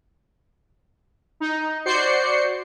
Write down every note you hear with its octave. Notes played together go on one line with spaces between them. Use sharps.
D#4
F#4 C5 D5 G6 C7 C#7